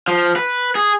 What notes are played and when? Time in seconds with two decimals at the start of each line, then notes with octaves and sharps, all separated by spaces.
0.08 F3
0.36 B4
0.75 G#4